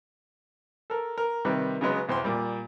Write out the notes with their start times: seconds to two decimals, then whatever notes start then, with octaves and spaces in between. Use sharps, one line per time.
0.90 A4 A#4
1.18 A#4
1.45 C3 D#3 G3 B4
1.81 C#3 F#3 G#3 B3
2.08 B1 E2 C5 G5 C6
2.24 A#2 G3